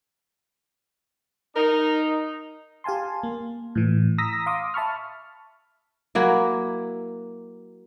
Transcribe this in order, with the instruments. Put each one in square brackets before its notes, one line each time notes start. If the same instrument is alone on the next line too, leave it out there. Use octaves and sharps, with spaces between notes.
[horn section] D#4 [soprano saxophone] A#4
[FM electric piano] G4 F5 G#5 A5 C6
A#3
A2 E3
A#5 D#6 E6 A#6 B6
F5 C6 D6 D#6
E5 A5 B5 C#6 F6
[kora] F#3 A#3 E4